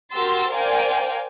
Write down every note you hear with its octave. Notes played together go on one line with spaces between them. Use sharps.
F#4 G4 A#4 C6 E6 A6
A#4 C5 D5 F5 G5 G#5